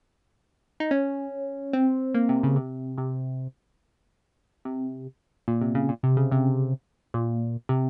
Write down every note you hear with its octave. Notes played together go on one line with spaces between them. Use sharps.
D#4
C#4
C4
A#3
C3
C#3
C3
C3
C3
A#2
C3
C#3
A#2
C3
C#3
C3
A#2
C3